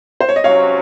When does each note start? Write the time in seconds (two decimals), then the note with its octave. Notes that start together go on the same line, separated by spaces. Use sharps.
0.20 C5
0.29 C#5
0.36 D#5
0.44 C3 F#3 C#4 C#5 F5